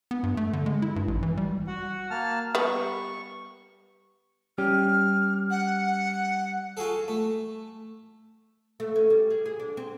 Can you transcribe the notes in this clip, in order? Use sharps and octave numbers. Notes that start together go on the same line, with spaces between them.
B3
G2
A3
D3
G#3
E4
G2
A1
E3
G3
F#4 F#5
A#3 A5 F6
G3 B3 C#6
G3 C#4 G4 F6
F#5
F4 F#4 G#4 A4
A3
A3
C#4
G3
G#4
G#4
D4
C4